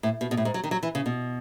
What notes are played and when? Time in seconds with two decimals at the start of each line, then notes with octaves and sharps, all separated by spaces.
0.03 A2
0.21 B2
0.31 B2
0.37 A2
0.45 G#2
0.54 F#3
0.64 D#3
0.71 F#3
0.83 E3
0.95 C#3
1.06 B2